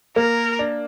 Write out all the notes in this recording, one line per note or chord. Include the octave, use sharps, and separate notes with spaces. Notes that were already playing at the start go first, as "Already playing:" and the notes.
A#3 A#4
D4